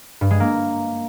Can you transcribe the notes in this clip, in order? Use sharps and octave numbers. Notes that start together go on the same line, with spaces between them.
G2
G#3
A#3